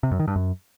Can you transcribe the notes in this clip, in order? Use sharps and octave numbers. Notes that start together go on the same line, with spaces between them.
C3
F#2
D#3
G2
F#2